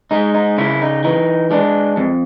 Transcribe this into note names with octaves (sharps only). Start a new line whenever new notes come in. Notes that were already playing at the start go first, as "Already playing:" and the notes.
G#3 D#4
D#4
C#3 E4
D#4
E3 D#4
G#3 D4
F2